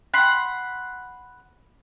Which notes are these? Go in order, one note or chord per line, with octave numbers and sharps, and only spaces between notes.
F#5 B5 C6